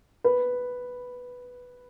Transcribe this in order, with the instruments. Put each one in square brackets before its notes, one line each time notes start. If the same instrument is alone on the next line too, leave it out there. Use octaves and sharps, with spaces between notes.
[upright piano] B4